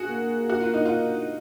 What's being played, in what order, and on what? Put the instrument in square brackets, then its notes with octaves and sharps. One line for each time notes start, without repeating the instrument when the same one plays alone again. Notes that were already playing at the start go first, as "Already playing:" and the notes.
Already playing: [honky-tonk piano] F#4 G#4
[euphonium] A#3
[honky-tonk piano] F#4
F4
D#4
F4